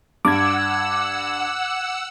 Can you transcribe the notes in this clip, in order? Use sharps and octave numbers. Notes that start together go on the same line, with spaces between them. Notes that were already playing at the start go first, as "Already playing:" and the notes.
G2 F#5 D6 E6 G#6